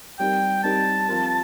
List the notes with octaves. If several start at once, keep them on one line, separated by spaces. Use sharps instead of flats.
G3 C4 D#4 G4 A#4 G5
G3 C4 D#4 G4 A#4 A5
F3 C4 F4 A#4